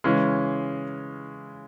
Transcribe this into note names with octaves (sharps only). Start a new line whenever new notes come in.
C#3 E3 G#3 C#4